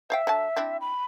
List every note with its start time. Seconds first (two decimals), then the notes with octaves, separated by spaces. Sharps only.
0.10 C5 E5 F5 G5
0.27 D3 F#3 A5
0.56 C4 D4 E4
0.81 B5